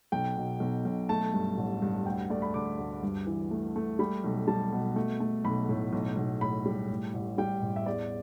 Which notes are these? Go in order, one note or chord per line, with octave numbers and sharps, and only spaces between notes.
B1 G5
B2
B1
B1
A3 A5
G2
A1
G2
D2 G5
A3 D5
B5
D3 D6
D2
G2
E3
A3
A3
G3 B5
B1
G3 A5
B2
A3
A3
B1 B5
A2
B1
B1
A2 B5
G3
A2
A1
G3 G5
A1
E5
E2 D5